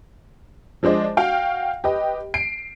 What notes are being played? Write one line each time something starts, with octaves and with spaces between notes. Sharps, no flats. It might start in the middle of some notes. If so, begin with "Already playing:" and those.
F3 G#3 D4 C5 D#5
F#4 F5 G5
G4 B4 D#5
C7 D7